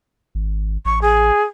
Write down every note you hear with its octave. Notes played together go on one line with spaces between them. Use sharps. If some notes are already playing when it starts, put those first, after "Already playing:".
G#1
A1 C#6
G#4